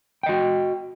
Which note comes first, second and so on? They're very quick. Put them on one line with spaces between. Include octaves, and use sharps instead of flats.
G5 D#5 F#4